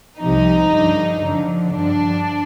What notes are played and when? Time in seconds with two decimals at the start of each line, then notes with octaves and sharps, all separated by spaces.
0.21 C2 C3 F3 D#4
0.71 G2 D3 F3
1.21 F2 D3 F3
1.71 G2 D3 F3 D4